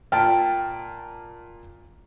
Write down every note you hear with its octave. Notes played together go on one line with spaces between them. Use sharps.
A#2 G5 A5 F6